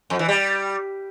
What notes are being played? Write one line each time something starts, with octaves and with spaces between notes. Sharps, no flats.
F2
E3
G3